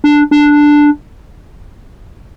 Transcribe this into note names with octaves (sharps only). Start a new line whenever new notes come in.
D4
D4